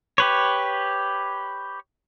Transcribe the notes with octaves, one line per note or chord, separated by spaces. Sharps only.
G4 B4 C#5